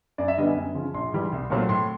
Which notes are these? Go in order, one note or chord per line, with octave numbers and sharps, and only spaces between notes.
F#2 D5
E5
D3 G3 B3 D4 D#5
G#5
F#2
C#3 F3
A#1 C6
G#2 E3 G3
C2
A#2 F#3 A3 C4
A2 C6